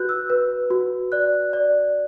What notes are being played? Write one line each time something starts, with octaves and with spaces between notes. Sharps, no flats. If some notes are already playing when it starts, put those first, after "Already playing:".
Already playing: F#4 B4 F#6 G6
E6
B4
F#4
D5 F#6
D5